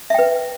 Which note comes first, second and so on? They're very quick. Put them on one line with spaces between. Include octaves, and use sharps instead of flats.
E5 G5 B4